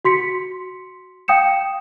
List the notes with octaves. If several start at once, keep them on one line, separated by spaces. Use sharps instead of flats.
F#4 C6 B6 C#7
F5 G5 D#6 G6 C#7 E7